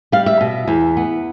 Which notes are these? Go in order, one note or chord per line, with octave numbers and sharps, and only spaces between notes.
G3 F5
E5
B2
E2
B3